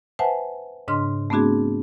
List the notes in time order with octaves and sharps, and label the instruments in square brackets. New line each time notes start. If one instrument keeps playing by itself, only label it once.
[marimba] B4 C5 E5 F#5 G#5 A5
G#2 C#3 D4 D#5 C6 F6
A3 B3 C4 D4 F#4 G#4